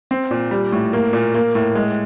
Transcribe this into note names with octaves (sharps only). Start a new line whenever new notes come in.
C4
A#2
G3
A2
A#3
A#2
A#3
A2
G#3